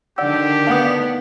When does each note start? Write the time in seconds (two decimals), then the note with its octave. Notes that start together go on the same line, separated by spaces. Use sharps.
0.18 D3 D#3 D4 G4 D5 F#5 E6
0.67 B3 F5 F#5 D#6